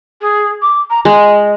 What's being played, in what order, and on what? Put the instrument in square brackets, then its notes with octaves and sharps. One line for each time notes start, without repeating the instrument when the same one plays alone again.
[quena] G#4
D6
A#5
[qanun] G#3 [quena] D#5